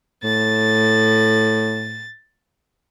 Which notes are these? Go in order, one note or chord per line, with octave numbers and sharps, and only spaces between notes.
A2 A6